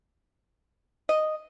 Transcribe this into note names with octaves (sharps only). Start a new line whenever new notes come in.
D#5